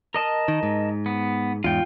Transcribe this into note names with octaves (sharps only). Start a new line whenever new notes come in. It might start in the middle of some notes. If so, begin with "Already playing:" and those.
A#4 D#5 A5
D#3
G#2
B3
E2 G#2 F4 G5